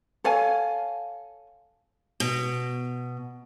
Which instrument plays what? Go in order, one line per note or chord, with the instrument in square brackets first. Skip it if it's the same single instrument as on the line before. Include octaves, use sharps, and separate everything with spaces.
[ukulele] A4 C#5 F5 G#5
[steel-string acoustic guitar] B2